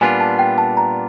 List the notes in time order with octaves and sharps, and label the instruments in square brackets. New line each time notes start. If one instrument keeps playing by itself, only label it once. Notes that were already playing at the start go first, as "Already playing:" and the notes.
[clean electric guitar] A#2 G3 B3 D4 F4 [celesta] G#5
[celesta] A5
G5
A5
A#5